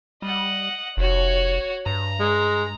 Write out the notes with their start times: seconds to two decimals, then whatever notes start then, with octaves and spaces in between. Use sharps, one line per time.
0.22 G3 D#5 F#5
0.97 F1 F#4 C#5
1.86 G2 A#5
2.20 G#3